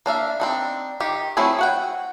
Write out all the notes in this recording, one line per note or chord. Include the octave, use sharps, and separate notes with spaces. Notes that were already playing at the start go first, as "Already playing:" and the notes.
A#3 D4 E5 F5
C4 D4 D#4
D#3 G4
F#3 A3 C4 E4 G#4
F#4 F#5 G5